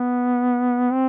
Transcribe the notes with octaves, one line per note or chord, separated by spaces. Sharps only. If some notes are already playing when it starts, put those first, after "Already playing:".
Already playing: B3
C4